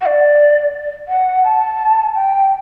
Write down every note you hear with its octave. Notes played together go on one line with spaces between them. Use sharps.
F#5
D5
F#5
A5
G5